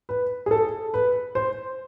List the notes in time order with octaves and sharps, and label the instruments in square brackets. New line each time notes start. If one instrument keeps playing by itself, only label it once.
[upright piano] B4
G#4
A4
B4
C5